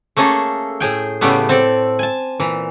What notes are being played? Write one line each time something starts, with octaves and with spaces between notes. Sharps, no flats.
A3 A#3 C#4 G#4 A4
A2 G#4 G5
A2 C#3 G3 A3 B3
C4 A4 D5
G#5 A5
A#2 E3